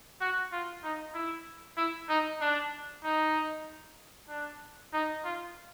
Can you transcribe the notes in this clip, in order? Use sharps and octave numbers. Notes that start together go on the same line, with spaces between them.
F#4
F4
D#4
E4
E4
D#4
D4
D#4
D4
D#4
F4